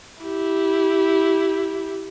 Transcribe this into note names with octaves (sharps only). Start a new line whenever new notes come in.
E4 G4